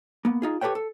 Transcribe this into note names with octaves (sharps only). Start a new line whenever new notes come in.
A#3 B3
D#4 F4 G#4
G4 A4 B4 C#5 G5
A4